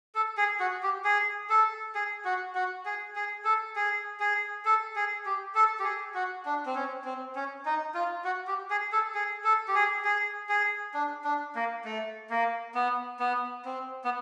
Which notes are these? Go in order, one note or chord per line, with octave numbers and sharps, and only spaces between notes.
A4
G#4
F#4
G4
G#4
A4
G#4
F#4
F#4
G#4
G#4
A4
G#4
G#4
A4
G#4
G4
A4
G4
G#4
F#4
D4
C4
C#4
C4
C#4
D#4
F4
F#4
G4
G#4
A4
G#4
A4
G4
G#4
G#4
G#4
D4
D4
A#3
A3
A#3
B3
B3
C4
B3